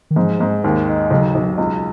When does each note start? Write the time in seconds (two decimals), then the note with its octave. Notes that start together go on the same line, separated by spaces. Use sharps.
0.11 D#3
0.16 G#2 F3
0.41 G#2
0.64 D#2
0.88 D#4
1.11 B1 C#3
1.35 B1
1.58 C#2